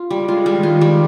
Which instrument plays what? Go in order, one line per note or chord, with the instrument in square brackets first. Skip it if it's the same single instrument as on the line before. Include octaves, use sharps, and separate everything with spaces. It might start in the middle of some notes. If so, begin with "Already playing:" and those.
Already playing: [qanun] F4
[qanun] G3 [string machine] G#3
[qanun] F4
[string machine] D#3 [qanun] G3
[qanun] F4
G3